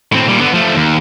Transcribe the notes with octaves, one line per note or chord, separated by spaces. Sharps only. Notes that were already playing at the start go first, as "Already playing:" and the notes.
A2 C4
A#2 G3
D3 B3
F3 A3
D#2